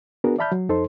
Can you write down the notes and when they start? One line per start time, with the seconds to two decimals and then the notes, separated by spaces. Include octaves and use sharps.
0.24 B3 D4 F#4 G#4 A#4
0.39 D5 E5 A5 B5 F6 G6
0.52 F#3
0.69 F2 D#4 A4 C5 C6